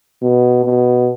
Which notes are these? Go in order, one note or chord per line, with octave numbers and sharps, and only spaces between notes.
B2
B2